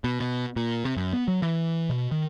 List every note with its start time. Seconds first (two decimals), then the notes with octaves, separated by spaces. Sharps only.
0.04 B2
0.20 B2
0.56 A#2
0.85 C3
0.97 F#2
1.13 B3
1.28 F#3
1.42 E3
1.90 B2
2.11 D#3